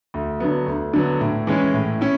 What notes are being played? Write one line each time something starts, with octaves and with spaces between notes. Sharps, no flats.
D2
D3 F#3 B3
D2
D3 F#3 B3
A2
E3 G#3 C#4 E4
A2
C#4 E4